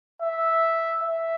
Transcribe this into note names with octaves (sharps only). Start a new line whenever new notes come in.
E5
E5